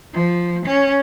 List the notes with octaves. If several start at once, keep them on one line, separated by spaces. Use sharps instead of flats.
F3
C#4